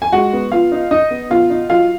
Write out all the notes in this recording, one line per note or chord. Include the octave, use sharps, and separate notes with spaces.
G#5
G#3 F#4 F#5
B3
B3 F4 F5
D#4
D#4 D#5
B3
B2 F4 F5
D#4
F#3 F4 F5